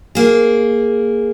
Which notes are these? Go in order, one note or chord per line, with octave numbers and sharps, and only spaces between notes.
A#3 G#4